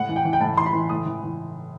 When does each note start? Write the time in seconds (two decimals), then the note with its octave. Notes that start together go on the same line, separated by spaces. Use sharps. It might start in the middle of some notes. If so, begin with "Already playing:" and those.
Already playing: A2 F#5
0.09 E3
0.16 G5
0.25 E3
0.33 G5
0.40 A2 A5
0.57 E3 C6
0.66 B5
0.73 E3
0.89 A2 D#6
1.06 E3
1.23 E3